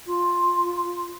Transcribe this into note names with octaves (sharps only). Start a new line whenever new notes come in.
F4